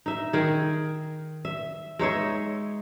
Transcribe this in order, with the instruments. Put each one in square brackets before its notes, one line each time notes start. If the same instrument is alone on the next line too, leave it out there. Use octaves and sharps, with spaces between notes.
[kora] D#4 E5
D#3 G#4
E5
G#3 D#4 C#5 E5